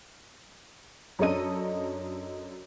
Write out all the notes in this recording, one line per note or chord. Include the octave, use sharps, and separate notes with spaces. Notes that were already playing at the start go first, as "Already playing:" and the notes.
F#2 C#4 D4 A4 D#5 D#7